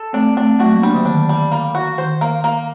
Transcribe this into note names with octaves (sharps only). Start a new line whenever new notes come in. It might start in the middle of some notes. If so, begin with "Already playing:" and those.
Already playing: A4
A3 C4 D4
A3 C4 D4
F#3 A3 F#4
G3 A#3
G3 A#3 D4
D3 F#3
D#3 D4
G3
A#3
F#4
D#3 C5
A#3
A#3